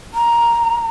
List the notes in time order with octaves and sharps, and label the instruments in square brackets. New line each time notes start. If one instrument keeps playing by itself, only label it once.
[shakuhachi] A#5